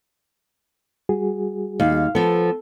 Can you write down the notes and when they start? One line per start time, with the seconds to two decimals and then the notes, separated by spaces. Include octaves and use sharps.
1.09 G3 F#4 G#4
1.80 D#2 F5
2.15 F3 B3 A4